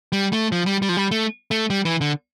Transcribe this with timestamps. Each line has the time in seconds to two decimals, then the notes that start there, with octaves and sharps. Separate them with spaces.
0.12 G3
0.33 A3
0.52 F3
0.66 G3
0.82 G3
0.89 F3
0.97 G3
1.11 A3
1.51 A3
1.70 G3
1.85 E3
2.01 D3